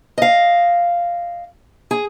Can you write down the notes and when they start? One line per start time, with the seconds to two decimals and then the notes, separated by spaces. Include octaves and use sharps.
0.18 D#5 F5
1.91 G#4